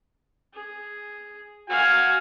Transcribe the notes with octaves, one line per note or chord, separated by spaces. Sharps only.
G#4
F#4 F5 G#5